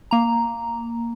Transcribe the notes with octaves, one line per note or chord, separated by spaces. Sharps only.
A#3 A#5